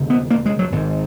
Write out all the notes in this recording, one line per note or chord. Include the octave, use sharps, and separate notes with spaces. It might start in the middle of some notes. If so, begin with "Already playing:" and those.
Already playing: E1 D#2 C#3
B3
A#3
G#3
F#3
G#1 G#2